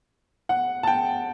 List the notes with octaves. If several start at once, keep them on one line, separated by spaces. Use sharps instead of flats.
F#5
A5
G5